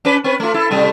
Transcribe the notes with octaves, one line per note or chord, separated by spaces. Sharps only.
C#4 B4
C4 C#4 B4
A3 F4
E4 A4
A2 C3 G3